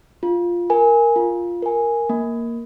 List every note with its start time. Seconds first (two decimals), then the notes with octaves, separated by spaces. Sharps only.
0.23 F4
0.70 A#4 G#5
1.16 F4
1.62 A#4 G#5
2.09 A#3